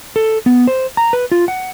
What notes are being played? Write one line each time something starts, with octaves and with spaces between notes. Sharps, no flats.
A4
B3
C5
A#5
B4
F4
F#5